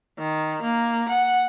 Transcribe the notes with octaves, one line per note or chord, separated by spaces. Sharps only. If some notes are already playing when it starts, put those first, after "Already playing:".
D#3
A#3
F#5